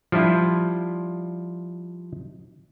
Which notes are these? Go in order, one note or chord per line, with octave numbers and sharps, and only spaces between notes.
F3 G3 D4 E4 F4